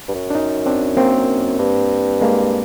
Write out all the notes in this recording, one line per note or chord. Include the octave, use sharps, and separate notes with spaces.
G2
F#2
D4
C#4 D#4
C4 D4
A#3 C4
G2
G#3 A#3